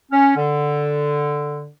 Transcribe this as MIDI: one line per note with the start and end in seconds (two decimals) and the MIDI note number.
0.11 0.32 61
0.36 1.68 50